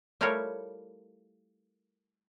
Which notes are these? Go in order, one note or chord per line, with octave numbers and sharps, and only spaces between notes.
G3 A3 E4 F4 A#4 C#5